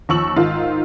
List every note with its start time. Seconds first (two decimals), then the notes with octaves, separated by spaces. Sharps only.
0.09 D#2 F3 C#6 E6 F#7
0.36 G#2 D#3 F4